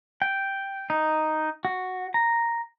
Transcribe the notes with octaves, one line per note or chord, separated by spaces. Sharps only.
G5
D#4
F#4
A#5